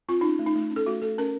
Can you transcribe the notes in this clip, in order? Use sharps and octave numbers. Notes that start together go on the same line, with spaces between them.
C4 F4
C#4 D#4
A3
D#4
A3
C#4
A4
A3 F#4
A3 A4
C#4 A#4